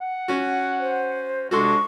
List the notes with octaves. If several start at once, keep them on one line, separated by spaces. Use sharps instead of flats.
F#5
C#4 F#4
C5
C3 G#3 D4 F#4 A4 C6 C#6